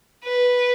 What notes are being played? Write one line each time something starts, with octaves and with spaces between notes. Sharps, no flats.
B4